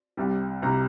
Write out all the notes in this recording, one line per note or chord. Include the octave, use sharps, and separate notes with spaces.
C2 C3 G3
C2 C3 G3 A#5